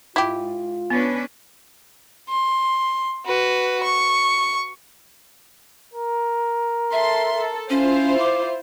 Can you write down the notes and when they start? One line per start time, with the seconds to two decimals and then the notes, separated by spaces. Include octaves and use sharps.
0.16 G#2 E4 F4 G4
0.90 B3 C#4 D4 B4
2.29 C6
3.26 F#4 B4
3.83 C#6
5.94 A#4
6.92 A4 E5 C6
7.36 A4
7.70 C#4 E4 F4 C5
8.19 D6